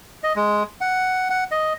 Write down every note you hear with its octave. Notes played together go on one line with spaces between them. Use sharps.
D#5
G#3
F#5
F#5
D#5